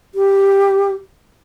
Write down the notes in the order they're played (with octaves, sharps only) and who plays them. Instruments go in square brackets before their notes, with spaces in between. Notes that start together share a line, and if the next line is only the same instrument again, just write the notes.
[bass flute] G4